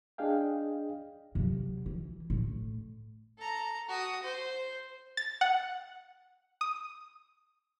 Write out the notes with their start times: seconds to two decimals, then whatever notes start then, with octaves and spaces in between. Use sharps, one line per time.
0.18 D4 G#4 D#5 F5 G5
1.35 C3 F#3
1.86 E3
2.30 A2
3.38 A4 A#5
3.88 F#4 D#6
4.23 C5
5.17 A6
5.41 F#5
6.61 D#6